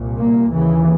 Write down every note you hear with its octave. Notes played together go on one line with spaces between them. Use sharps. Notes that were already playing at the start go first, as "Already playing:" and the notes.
Already playing: C2 A#2
A#3
D#2 C#3 E3